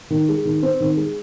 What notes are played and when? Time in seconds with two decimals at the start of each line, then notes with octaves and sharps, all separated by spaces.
0.10 D#3
0.29 G#3
0.45 D#3
0.63 C4
0.80 D#3
0.97 G#3